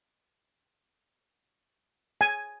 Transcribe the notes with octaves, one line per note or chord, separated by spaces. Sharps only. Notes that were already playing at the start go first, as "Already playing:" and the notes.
G#5